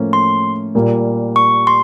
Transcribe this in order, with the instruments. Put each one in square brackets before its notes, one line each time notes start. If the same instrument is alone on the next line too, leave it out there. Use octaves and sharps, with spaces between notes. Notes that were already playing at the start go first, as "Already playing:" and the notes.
Already playing: [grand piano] A2 F3 A#3 C#4
[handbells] C6
[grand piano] A#2 G3 A#3
[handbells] C#6
C6